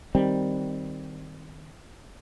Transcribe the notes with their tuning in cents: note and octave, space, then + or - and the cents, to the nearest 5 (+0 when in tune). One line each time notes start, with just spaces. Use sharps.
D#3 +0 G3 +0 C4 +0